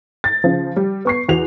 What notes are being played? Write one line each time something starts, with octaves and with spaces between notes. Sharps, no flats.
A6
C#3 F3
G3
B3 C#6 C7
E2 F#4 F7